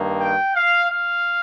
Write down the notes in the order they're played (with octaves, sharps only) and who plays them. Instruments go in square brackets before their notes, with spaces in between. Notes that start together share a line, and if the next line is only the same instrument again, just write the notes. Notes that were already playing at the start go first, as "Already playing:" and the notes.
Already playing: [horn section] G2 D#3 A#3
G5
F5
F5